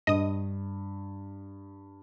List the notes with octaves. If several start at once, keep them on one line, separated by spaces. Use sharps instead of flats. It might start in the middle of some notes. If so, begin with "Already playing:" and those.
G2 D#5 D#6